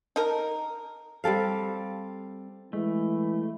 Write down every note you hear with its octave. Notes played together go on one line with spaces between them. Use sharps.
D#4 A#4
G3 C4 A4 F5
E3 G#3 A3